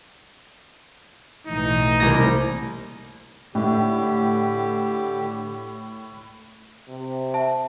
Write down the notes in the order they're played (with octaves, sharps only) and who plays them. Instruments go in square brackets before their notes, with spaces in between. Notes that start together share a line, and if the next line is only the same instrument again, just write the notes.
[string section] B1 A2 E3 [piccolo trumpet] D#4
[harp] C2 A#3 A#6
[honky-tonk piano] A2 [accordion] D3 G4
[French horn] C3
[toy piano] E5 A5